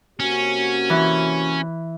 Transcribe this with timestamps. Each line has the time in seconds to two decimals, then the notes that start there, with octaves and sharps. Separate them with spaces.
0.20 C3 A#3 C#4 F#4
0.90 E3